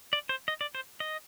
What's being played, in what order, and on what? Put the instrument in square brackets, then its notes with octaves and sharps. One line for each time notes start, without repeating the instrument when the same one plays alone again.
[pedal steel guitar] D5
C5
D#5
D5
C5
D#5